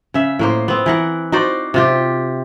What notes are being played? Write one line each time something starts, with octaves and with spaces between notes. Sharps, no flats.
C#3 E5
A2 A#3 C5
B3 C4
E3 A#4 F#5
D#4 F#4 C5 D5
C3 F4 G4